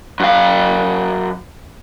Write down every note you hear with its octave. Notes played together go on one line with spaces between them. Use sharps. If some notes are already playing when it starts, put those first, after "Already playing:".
F#2 F5